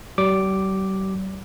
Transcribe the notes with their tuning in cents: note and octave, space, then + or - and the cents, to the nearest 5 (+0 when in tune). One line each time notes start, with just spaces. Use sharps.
G3 -40 D6 +0